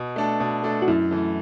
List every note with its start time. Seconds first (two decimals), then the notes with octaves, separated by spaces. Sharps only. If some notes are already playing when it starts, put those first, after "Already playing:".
Already playing: B2
0.16 A3 D4 A4
0.40 B2
0.63 A3 D4 A4
0.82 F#4
0.88 F#2 E4
1.11 E3 A3